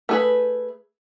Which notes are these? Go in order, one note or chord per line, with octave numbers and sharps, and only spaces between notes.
A3 G#4 B4